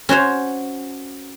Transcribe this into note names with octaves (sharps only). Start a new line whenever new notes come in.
C#4 F#4 C5 C#5